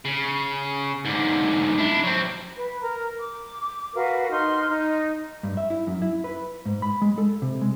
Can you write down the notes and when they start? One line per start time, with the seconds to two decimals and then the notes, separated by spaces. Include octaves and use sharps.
0.05 C#3
1.05 G#2 D3
1.78 D4 E4
2.04 F#3 C4
2.55 B4
2.81 A#4 A#5
3.19 D6
3.94 F#4 A#4 B4 F5
4.31 D#4 C6 F6
4.69 D#4
5.43 G2
5.57 E5
5.70 E4
5.87 F#2
6.02 E4
6.24 B4
6.66 G#2
6.82 B5
7.02 G#3
7.18 A4
7.42 C3
7.62 G#3